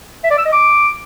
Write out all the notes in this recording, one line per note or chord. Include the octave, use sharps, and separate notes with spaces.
E5
D5
E6
D#5
D6